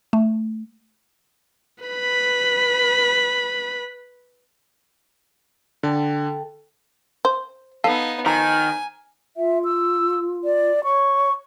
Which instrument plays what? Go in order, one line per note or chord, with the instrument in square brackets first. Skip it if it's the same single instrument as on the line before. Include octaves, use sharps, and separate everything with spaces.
[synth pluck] A3
[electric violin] B4 B5
[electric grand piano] D3 [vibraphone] A4 G5 A5
[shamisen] C5
[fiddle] B3 D#4 [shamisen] A4 [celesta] F5 C7 D#7
[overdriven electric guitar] D#3 [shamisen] F3 [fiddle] G#5 [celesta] A#5
[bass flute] F4 [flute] E5
[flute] E6
D5
[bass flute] C#5 [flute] C#6